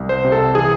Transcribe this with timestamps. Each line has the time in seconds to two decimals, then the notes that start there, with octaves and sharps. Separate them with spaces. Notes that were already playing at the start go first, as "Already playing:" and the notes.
Already playing: C2
0.09 C5
0.24 C3
0.32 A4
0.55 E3 G#4